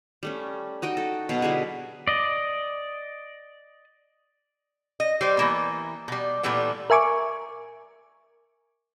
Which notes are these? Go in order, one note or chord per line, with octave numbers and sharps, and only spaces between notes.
G3 A3 C#4
D#4 F#4 D#5 G5
A4
B2 F#3 F5
D3 G3 E4 G#4
D5 D#5
D#5
G3 C5
E3 A#3 B3
B2 G3
A#2 E3 G3 A3 B3
A#4 E5 G#5 C#6 D6